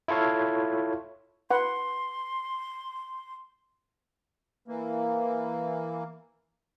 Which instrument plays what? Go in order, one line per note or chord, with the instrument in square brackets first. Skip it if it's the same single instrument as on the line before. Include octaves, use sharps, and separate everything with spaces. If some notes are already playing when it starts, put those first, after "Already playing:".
[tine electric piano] E4 F4 A4 C#5 F5
[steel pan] B4 F#5 [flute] C6
[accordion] E3 A#3